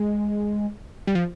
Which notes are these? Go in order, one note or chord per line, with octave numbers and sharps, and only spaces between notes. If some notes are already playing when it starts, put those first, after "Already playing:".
Already playing: G#3
G3
F3